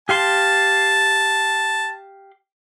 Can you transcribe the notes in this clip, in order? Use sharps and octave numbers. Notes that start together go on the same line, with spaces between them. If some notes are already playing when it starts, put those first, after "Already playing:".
G4 F5 A5 C6